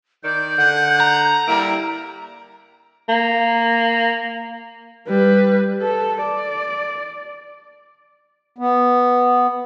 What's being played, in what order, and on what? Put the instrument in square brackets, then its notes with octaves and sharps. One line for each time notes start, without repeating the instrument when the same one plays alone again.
[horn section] D#3 D5 [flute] G6
[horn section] D3 F#5
[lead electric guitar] A#5
[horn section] G3 A#3 E4
[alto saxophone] A#3
[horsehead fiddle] G3 B4
A4
D5
[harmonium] B3